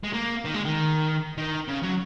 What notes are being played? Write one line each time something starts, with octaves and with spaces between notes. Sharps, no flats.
G#3
A#3
D#3
G#3
D#3
D#3
C#3
F#3